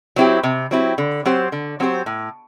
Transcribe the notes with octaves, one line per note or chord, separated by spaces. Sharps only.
F#3 C4 E4 G4
C3
F#3 C4 E4 G4
D3
F#3 C4 G4 C5
D3
F#3 C4 G4 C5
A2